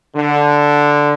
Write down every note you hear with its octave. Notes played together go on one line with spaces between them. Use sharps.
D3